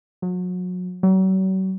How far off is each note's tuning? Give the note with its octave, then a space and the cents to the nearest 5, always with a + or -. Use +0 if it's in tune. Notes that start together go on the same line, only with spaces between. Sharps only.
F#3 -35
F#3 +40